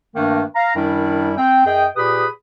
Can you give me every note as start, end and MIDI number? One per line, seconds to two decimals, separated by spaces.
0.16 0.43 43
0.16 0.43 51
0.16 0.43 57
0.16 0.43 58
0.16 0.43 62
0.55 0.75 77
0.55 0.75 82
0.76 1.32 42
0.76 1.32 51
0.76 1.32 55
0.76 1.32 62
0.76 1.32 64
1.37 1.65 60
1.37 1.65 79
1.66 1.86 42
1.66 1.86 68
1.66 1.86 75
1.66 1.86 79
1.96 2.26 46
1.96 2.26 67
1.96 2.26 68
1.96 2.26 71
1.96 2.26 83
1.96 2.26 87